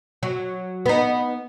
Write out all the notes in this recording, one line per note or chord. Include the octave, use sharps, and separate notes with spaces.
F#3
B3 D#4